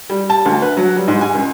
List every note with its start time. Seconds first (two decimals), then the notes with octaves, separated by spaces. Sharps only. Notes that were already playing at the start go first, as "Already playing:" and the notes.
0.10 G3
0.30 A5
0.46 D2
0.62 B4
0.77 F#3
0.96 G3
1.08 G#2
1.21 G#5
1.35 C#2